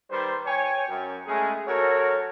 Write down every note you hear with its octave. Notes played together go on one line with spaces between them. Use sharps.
D#3 G3 B4 C5
C#5 G5 G#5
F#2
C#3 G#3 A3 C#4 G#4
F#2 F#4 A4 A#4 C#5